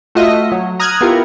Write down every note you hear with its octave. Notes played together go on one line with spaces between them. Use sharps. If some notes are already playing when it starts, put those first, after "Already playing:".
A3 F4 F#4 D#5 E5
F#3
A#5 D#6 F6 F#6 G#6
B3 E4 F4 G4 A#4